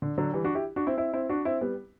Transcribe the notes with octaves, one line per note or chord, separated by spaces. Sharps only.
D3
D3 F#3
E3 G3
D4 F#4
E4 G4
D4 F#4
C4 E4
C4 E4
C4 E4
D4 F#4
C4 E4
G3 B3